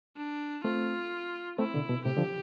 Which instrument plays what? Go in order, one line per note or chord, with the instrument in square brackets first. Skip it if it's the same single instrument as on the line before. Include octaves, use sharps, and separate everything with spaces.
[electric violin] D4
[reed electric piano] A3 C4 [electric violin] F4
[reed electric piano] A3 C4 [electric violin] E4
[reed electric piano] B2 D3
B2
[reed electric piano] A2 C3 [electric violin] G4
[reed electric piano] D3 F3